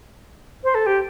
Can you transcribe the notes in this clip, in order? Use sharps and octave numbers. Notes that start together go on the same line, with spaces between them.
C5
A4
G4